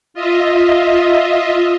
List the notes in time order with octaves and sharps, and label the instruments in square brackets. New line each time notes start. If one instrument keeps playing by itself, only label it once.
[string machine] F4 D#5 E5